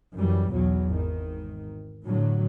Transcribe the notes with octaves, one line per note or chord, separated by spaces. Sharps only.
F#2 E3 G3
B1 E2 F#3
G#1 D#3
A2 D3 F#3